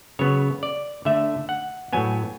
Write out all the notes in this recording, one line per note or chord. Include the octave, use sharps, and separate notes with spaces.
C#3 F#3 B3 C#5
D5
D3 A3 E5
F#5
A2 F#3 B3 G#5